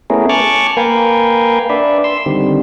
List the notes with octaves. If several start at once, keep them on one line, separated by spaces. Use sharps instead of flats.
A3 B3 C#4 E4 G#4 A#4
G#5 A5 C#6 D6 F6 F#6
A#3 A#4 B4 F5 G5 G#5
D4 B4 D5 E5
C6 E6
D3 D#3 G3 C4